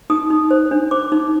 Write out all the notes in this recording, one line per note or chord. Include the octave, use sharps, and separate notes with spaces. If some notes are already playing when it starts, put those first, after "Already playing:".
D#4 D#6
D#4
C5
D4
C5 D6
D#4